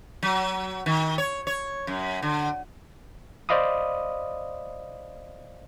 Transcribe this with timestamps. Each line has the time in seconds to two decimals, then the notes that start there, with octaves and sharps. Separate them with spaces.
0.23 F#3
0.86 D#3
1.18 C#5
1.47 C#5
1.87 F#2
2.22 D3
3.49 C5 D5 D#5 F5 B5 D#6